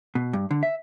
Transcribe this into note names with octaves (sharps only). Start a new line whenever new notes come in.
B2
G2
D3
E5